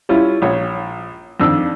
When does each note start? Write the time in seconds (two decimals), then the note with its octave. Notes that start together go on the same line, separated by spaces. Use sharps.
0.09 G3 C#4 E4 F4
0.42 A#1 C#5
1.40 F2 D#3 D4 E6